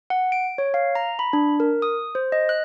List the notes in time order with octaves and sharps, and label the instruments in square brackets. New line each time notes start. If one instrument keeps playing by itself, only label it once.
[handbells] F#5
D7
C#5
F5
A#5
B5
D4
A#4
D#6
C5
D#5
F#6